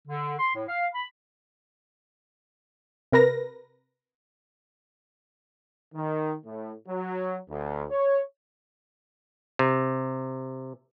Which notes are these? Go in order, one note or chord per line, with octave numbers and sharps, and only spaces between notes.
D3
C6
A2
F5
B5
C3 A#4 B4 A#6
D#3
A2
F#3
D2
C#5
C3